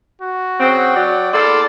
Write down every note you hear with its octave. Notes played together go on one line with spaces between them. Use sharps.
F#4
C#3 C4 F#5 G5
F#3 D5
E2 A#3 A4 D5 C6 E6